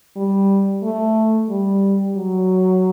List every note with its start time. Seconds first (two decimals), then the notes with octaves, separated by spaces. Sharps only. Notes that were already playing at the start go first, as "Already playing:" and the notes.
0.16 G3
0.83 A3
1.50 G3
2.16 F#3